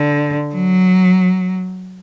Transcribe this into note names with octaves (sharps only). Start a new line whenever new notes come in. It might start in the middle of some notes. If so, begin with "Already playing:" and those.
Already playing: D3
F#3